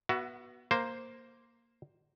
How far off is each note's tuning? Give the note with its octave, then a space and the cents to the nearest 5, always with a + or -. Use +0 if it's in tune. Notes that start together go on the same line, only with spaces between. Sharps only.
B3 -20 F#4 +10 E5 +30
A#3 +0 C5 +0